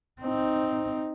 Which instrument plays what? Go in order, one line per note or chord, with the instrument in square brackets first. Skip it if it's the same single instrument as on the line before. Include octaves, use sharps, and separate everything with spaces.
[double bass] C4 D#4